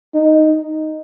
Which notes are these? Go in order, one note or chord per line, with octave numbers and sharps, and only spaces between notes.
D#4